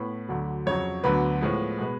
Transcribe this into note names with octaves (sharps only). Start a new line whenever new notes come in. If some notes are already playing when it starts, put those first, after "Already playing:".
Already playing: A2 B3 B5
D2 D3 F#3
F2 C#3 F#3 C#5
D2 D3 F#3 B3 B4
A2 F3 G#3 B3
B2 G#3 B3